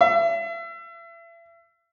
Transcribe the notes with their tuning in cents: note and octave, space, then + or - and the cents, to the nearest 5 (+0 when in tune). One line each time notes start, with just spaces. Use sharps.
E5 +35